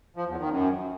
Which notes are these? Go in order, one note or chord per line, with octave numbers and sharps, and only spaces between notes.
F3
E2
D#3
F#2